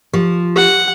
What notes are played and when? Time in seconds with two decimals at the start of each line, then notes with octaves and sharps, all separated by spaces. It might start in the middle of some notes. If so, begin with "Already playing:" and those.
0.13 F3 G4
0.56 G4 F#5